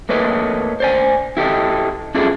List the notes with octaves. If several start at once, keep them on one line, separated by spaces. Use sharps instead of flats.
A3 A#3 A4 B4 C#5 D#5
C5 D5 G#5
E4 G4 A4 D#5
C#4 D4 E4 F4 G#4 A4